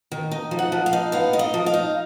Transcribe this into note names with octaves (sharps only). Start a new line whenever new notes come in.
D#3
D#4
F3
F#5
F3
F5
D#4
B3 F5
D#4
D#5
F3
F5
D#4